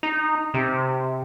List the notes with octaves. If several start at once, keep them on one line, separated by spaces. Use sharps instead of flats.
D#4
C3